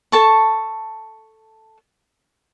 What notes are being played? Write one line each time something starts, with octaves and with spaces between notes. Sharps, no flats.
A4 A5 C#6